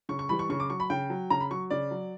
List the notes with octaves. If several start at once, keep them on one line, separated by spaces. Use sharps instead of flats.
C#3 C#6
C#6
E3 G3 B5
C#6
C#3 C#6
D6
F#3 C#6
B5
C#3 G5
F#3
C#3 A#5
B5
F#3 C#6
C#3 D5
F#3